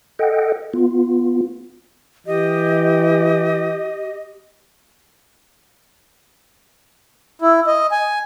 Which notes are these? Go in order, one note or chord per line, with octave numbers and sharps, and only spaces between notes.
A4 D#5 F#5 G5
B3 F4
E3 G4 D#5
E4
D#5
G#5